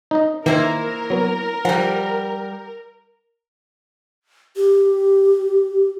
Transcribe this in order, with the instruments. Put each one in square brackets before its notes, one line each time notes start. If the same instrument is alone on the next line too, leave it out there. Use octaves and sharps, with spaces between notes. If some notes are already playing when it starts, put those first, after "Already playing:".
[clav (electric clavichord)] D#4 D#5
[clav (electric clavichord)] D#3 E3 [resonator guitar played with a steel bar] A#3 E4 C5 [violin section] A#4
[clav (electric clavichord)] F#3 B3
[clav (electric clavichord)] F3 [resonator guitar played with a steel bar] G3 F#5
[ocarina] G4